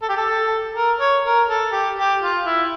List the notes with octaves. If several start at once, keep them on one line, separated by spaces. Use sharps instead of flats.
A4
G4
A4
A#4
C#5
A#4
A4
G4
G4
F4
E4